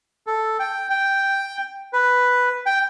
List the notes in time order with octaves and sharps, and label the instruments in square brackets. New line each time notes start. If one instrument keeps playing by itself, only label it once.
[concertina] A4
G5
G5
B4
G5